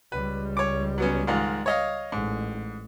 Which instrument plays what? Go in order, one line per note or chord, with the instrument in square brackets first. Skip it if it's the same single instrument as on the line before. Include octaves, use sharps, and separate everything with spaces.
[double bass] C#2 G3 [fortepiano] B4
[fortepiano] C#5 D6
F#3 B3 C#4
G#2 D#3 F4
C#5 D#5 F5
[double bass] A1 [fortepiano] G#2